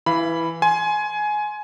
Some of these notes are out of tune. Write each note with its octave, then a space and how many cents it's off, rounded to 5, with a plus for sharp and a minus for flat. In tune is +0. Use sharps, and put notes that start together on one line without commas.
E3 +5 F5 -30 B5 +0
G#5 +15 C6 +0